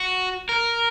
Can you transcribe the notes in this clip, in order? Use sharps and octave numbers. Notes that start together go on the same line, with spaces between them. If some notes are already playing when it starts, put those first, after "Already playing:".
Already playing: F#4
A#4